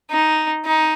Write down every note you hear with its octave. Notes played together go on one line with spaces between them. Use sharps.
D#4
D#4